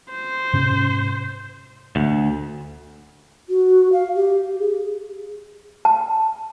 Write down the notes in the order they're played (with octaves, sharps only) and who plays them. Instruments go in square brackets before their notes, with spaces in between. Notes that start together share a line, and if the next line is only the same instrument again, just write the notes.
[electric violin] C5
[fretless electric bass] G#2 C3 C#4
[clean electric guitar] D2
[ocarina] F#4
F5
G4
G#4
[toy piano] A5